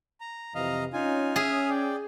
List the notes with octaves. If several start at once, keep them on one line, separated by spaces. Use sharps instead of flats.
A#5
F2 C3 E3 D#5 F5 A#5
C#4 D#4 F4 G#5
G#4 E5 D#6 F6
D5 G5